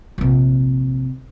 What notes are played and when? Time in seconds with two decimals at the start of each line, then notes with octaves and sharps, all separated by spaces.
0.18 A#1 C3